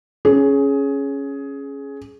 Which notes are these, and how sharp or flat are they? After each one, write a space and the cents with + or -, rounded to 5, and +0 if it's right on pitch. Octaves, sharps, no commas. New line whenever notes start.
C#4 +0 G#4 +15